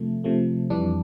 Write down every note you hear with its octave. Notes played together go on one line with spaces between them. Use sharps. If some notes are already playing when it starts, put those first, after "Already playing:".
Already playing: C3 F3 A3
C3 F3 A3
F2 E3 G3 D4